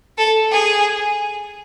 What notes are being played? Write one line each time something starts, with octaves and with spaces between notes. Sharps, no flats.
A4
G#4